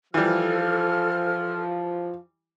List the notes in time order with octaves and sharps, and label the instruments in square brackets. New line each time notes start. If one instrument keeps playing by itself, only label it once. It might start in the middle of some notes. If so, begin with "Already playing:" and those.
[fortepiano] E3 G3 [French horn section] F3 [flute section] A4 F6